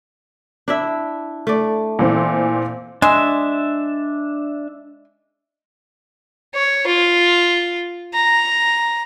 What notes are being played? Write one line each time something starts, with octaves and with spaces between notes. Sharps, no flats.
D4 E4 E5
A3 D5
A#2 E3 C4
G#3 D4 E5
C#5
F4
A#5